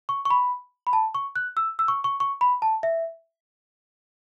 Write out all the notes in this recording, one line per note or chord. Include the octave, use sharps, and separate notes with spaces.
C#6
C#6
B5
B5
A5
C#6
F#6
E6
E6
C#6
C#6
C#6
B5
A5
E5